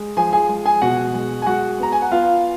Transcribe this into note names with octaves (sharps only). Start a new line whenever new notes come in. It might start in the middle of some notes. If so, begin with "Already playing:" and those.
Already playing: G#3
F3 G#4 G#5
G#4 G#5
G#3
G#4 G#5
B2 F#4 F#5
G#3
G#5
G#3 F#4 F#5
B3 A#5
G#5
F#5
B3 F4 F5